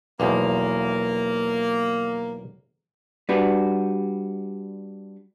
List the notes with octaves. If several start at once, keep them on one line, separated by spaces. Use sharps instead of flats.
B1 E2 F3 A#3
G3 D4 F#4 B4